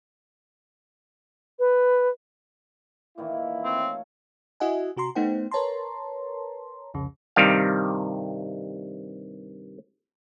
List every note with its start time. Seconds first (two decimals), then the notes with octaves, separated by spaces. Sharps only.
1.59 B4
3.18 A#2 D#3 E3 E4
3.64 A3 C4 C#5 F5
4.60 E4 F#4 D#5 E5 F#5 G#5
4.97 C3 F#4 A#5 C6
5.15 A3 B3 D#4 C5 F#5 G5
5.51 A#4 B4 C#5 A5 A#5 C6
6.94 C2 F2 C#3
7.36 G2 C3 D#3 G3 F5